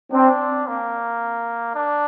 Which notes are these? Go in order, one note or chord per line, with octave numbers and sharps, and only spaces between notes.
C4 D4
A#3
D4